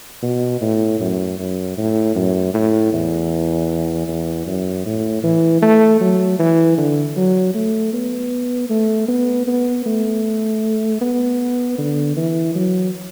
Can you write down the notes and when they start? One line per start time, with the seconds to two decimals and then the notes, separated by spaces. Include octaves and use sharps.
0.23 B2
0.62 A2
1.00 F#2
1.39 F#2
1.77 A2
2.16 F#2
2.54 A2
2.93 E2
4.08 E2
4.47 F#2
4.86 A2
5.23 E3
5.62 A3
6.01 F#3
6.39 E3
6.78 D3
7.16 F#3
7.54 A3
7.93 B3
8.70 A3
9.08 B3
9.47 B3
9.86 A3
11.01 B3
11.78 D3
12.17 E3
12.55 F#3